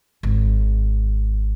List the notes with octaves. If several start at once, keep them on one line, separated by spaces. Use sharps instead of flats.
G#1